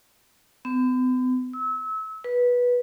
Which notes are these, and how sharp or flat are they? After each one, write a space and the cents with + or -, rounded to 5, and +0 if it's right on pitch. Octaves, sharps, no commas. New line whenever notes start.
B3 +45
E6 -30
B4 -15